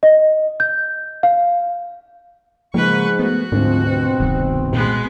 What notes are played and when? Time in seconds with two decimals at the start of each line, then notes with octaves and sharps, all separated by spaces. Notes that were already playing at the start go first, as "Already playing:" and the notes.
0.03 D#5
0.60 G6
1.23 F5
2.74 G#2 C#3 F3 G#3 A#3 B4 C#6
3.19 G#3 A3 B3 F#4
3.52 D2 G#2 F3 G3 G#3 C4 D4
3.85 B2 C4
4.20 D#1 C2 G2 D#3
4.73 A#2 G#3 B3